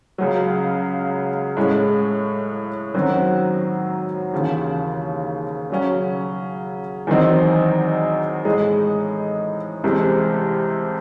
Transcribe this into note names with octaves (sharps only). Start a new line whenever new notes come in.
C#2 C#3 F#3
A2 G#3 C#4 G#4
F#2 D#3 F#3 C4 F#4
D#2 C#3 E3
C#3 F#3 C#4
E2 D#3 F#3 C4 D#4
A2 G#3 D#4 G#4
C2 C3 E3 G#3 C4